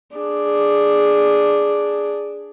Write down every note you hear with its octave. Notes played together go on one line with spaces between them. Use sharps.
D4 G#4